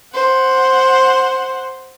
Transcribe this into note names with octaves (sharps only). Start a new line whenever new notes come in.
C5 F#5